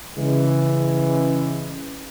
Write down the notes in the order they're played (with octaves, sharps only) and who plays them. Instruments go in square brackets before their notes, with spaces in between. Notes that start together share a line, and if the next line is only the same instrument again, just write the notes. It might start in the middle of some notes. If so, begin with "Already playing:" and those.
[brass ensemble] C#3 E3 G#3